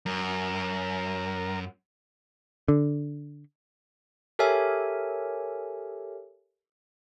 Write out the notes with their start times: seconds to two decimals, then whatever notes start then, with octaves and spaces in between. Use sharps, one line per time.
0.06 F#2 A#4
2.68 D3
4.39 G4 A4 A#4 C#5 E5 G#5